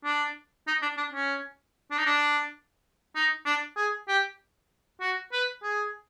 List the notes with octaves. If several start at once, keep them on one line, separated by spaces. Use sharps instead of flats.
D4
D#4
D4
D4
C#4
D4
D#4
D4
D#4
D4
G#4
G4
F#4
B4
G#4